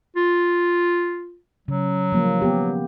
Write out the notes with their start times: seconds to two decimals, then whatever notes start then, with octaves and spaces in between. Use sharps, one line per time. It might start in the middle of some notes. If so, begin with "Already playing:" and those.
0.16 F4
1.68 C#3 F#3
2.12 F3 G3 A#3
2.42 B3 G4